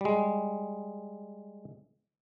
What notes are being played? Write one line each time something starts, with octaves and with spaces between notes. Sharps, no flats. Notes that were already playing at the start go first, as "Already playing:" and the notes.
G3 G#3